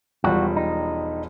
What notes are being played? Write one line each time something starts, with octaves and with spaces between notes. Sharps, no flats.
E1 F3 G3 F#4
D#4